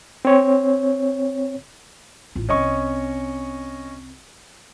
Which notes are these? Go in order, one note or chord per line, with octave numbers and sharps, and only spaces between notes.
C4 C#5
A1 F4
C2 C4 C#4 D#5 C#6